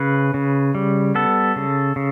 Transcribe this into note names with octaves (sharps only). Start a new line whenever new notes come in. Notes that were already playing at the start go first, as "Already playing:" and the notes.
Already playing: C#3 C#4 B4
C#3
G3
B3 A4
C#3
C#3